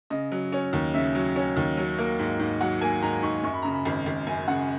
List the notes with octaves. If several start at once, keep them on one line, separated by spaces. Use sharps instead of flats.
C#3 D#5
F#3
C#4
D#2
C#3 E5
F#3
C#4
D#2
F#3
A#3
G#2
G#2
F#3 F#5
A#3 G#5
G#2 A#5
G#2 C#6
F#2 C#6
B5
C#3 A#5
B5
G#1
G#1
F#2 G#5
C#3 F#5